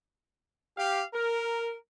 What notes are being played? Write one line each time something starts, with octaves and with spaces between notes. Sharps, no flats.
G4 F5
A#4